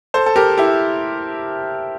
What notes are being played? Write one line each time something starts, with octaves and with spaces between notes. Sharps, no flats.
A4 C5
A4
G4 A#4
E4 G4